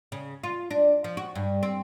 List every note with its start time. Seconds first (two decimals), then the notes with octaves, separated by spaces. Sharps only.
0.12 C#3
0.44 F4
0.71 D4
1.04 F3
1.17 F#4
1.35 G2
1.63 C4